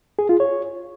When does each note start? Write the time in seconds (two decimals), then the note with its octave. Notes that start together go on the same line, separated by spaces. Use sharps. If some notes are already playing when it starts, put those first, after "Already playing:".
0.19 G#4
0.29 F4
0.40 C#5